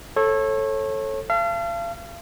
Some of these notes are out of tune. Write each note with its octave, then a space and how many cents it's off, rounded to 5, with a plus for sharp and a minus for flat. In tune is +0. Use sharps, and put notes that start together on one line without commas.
A4 +0 C#5 -30
F5 -40 A5 +0